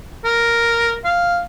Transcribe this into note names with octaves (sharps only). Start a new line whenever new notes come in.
A#4
F5